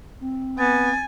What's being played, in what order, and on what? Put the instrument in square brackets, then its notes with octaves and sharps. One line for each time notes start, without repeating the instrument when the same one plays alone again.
[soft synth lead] C4
[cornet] B3 [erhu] G#5 [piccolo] A6